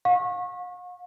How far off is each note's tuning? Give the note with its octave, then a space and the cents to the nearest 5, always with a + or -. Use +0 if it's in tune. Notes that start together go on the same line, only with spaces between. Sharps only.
F5 +45 C#6 -30